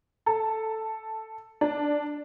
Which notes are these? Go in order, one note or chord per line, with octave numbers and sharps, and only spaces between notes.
A4
D4